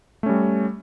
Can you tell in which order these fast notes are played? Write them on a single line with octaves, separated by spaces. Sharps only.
A3 C#4 G3